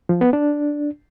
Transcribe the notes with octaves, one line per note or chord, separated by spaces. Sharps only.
F3
B3
D4